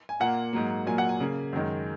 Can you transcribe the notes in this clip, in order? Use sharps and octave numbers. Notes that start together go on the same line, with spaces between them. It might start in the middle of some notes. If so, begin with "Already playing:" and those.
G#5
A#2 A#3 F#5
G#2 F#3 A#3
A#2 F#3 A#3 G#5
F#5
G#5
C#3 A#3
F#2 D#3 G#3